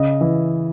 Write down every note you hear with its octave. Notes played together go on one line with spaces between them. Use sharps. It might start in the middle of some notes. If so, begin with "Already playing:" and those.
Already playing: C#3 D#5
E3